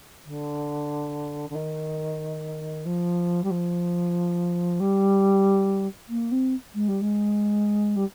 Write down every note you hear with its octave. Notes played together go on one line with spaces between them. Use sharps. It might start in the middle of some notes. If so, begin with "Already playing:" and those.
D3
D3
D#3
F3
G3
F3
G3
A#3
C4
G#3
G3
G#3
G3